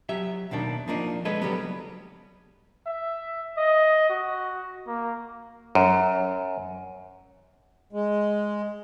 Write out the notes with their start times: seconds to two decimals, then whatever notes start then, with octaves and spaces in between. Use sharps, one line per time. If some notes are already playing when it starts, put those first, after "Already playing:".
0.09 F#3 G4 E5
0.51 D#2 B2 D#3 D4
0.88 F3 A#3 D4 D#4
1.25 G#3 A4 B4 C#5 D#5
1.42 C#3 F#3 G3 B3
2.87 E5
3.57 D#5
4.09 F#4
4.87 A#3
5.75 F#2
7.93 G#3